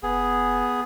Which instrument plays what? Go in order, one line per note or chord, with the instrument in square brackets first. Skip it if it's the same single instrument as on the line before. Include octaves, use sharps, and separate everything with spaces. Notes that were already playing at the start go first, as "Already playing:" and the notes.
[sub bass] F1 [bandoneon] B3 G#4